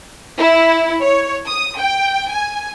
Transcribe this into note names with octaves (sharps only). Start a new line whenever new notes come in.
E4
C#5
D#6
G5
G#5